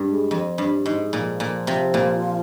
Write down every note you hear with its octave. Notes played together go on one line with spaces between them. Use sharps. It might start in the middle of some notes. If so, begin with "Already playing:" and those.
Already playing: G2
G#3
F2
G2
G#2
A#2 F3
A#2
C3
A#2